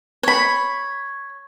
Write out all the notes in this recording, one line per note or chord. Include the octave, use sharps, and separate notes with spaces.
C#5 B5